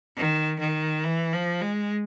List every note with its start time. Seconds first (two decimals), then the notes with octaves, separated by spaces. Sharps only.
0.17 D#3
0.59 D#3
1.04 E3
1.33 F3
1.61 G#3